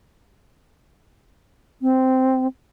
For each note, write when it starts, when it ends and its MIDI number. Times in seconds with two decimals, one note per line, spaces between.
1.82 2.47 60